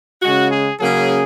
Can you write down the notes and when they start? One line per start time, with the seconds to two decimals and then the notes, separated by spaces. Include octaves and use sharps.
0.22 C#3 G#3 C#4 F#4
0.51 G#4
0.79 C#3 F#3 A#3 C#4 G#4